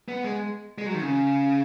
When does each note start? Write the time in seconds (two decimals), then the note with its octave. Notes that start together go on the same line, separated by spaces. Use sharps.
0.08 B3
0.24 G#3
0.78 G#3
0.86 F#3
0.94 D#3
1.02 C#3